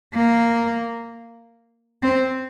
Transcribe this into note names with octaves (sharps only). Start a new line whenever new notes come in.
A#3
C4